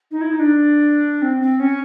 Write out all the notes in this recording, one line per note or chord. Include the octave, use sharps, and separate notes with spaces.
D#4
E4
D#4
D4
C4
C4
C#4